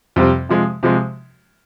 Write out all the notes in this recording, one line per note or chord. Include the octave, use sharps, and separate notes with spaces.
F2 C3 G3 C4
C3 F3 G#3
C3 F3 G#3